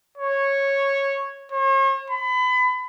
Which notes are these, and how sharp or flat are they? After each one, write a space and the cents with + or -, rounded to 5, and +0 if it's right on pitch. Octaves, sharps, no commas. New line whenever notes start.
C#5 -10
C#5 -45
B5 +30